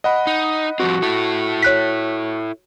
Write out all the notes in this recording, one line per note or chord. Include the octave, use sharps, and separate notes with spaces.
D#5 F#5 B5
D#4
F3 G3 C4 F#4
E4 A4
C#5 F#6 B6